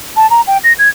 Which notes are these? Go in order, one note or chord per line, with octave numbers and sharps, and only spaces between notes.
A5
A#5
G5
A#6
G#6